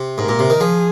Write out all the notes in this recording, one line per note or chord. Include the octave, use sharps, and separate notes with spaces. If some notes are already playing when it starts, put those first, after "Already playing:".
Already playing: C3
G#2 A#4
A#2
C3
D#3
F3 G#4